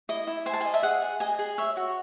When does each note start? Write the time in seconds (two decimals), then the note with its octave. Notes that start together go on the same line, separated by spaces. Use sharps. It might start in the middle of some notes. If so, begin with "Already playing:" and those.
0.09 E4 D#5
0.27 E4
0.46 C5 G#5
0.53 A5
0.61 G#5
0.65 D#5
0.74 E5
0.83 G#4 F#5
1.02 G#4
1.20 D#5 G#5
1.39 G#4
1.58 C#5 E5
1.77 F#4